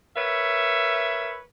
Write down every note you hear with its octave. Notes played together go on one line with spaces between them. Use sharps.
A#4 B4 C#5 E5